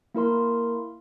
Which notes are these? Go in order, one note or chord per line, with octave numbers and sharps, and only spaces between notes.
A#3 E4 A#4 C6